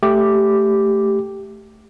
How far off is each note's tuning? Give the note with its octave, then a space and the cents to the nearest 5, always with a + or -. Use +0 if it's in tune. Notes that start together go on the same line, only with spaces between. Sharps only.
A3 +0 G4 +0 D6 +0